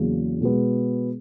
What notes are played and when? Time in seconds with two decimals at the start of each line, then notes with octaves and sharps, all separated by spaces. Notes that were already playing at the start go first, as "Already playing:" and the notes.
Already playing: E2 C#3 F#3 A#3
0.41 B2 G#3 B3